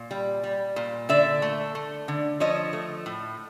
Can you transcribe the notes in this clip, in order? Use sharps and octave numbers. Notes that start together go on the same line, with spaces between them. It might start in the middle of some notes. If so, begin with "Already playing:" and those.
Already playing: A#2
G3
G3
A#2
D3 D5 E5
A3
A3
D3
F3 C#5 D#5
A3
A2